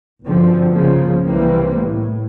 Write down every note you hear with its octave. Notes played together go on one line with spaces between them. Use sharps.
G1 F#2 D3 F3 C4
C2 C#3 F3 A#3
C2 C3 E3 G3 A#3 C4
A2